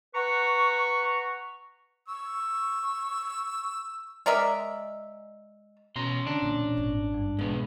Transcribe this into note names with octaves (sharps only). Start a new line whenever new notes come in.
B4 F#5 A#5 C#6
C#6 E6
G#3 A#4 D5 E5
B2 C#4 A#5 C6
D3 D4
B1 E2 A#2
G#1
G2
B1 G#2 F3 G#3 B3